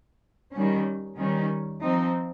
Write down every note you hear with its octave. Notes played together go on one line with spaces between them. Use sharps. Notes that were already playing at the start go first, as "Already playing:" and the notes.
D#3 G3 C#4
D#3 G3 C#4
F3 C4 D#4